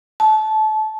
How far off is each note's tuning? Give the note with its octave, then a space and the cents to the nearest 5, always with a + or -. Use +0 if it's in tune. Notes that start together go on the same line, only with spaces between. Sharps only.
A5 -25